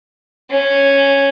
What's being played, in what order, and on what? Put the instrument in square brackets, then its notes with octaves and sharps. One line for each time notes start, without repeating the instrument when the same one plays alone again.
[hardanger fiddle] C#4